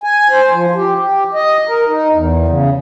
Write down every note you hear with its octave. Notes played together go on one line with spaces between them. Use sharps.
G#5
C5
F3
G4
G4
D#5
A#4
D#4
E2
C#3